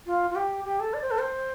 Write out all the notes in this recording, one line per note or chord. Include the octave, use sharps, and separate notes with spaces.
F4
F4
G4
G4
A4
D5
C5
A4
C5